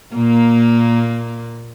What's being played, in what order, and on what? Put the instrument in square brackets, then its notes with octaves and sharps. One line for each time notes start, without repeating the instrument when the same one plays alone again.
[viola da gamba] A#2 A#3